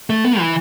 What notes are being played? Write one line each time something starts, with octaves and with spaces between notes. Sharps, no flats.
A3
B3
E3